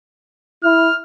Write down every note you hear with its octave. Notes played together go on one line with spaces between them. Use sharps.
E4 F6